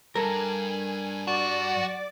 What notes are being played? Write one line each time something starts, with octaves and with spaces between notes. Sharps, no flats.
G2 A4 A#4 G#5
F#4 D5 D6